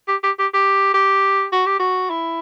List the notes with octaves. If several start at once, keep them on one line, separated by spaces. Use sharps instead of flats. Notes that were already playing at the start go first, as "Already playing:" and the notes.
G4
G4
G4
G4
G4
F#4
G4
F#4
E4